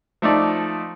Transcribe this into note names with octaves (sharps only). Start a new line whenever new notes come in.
F3 A3 D#4 D5